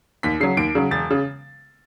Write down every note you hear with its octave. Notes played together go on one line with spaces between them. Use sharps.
D#2 B6
C#3 F#3 C7
D#2 D7
C#3 F#3
E1 A6
C#3